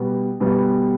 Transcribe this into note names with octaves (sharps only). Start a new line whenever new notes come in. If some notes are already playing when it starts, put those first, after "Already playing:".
Already playing: B2 G3 B3
B2 G3 B3